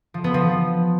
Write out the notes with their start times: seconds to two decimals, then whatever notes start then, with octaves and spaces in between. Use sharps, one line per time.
0.14 F3
0.24 B3
0.34 F3